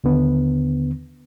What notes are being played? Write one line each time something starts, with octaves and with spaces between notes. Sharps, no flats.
D#2 D3 B3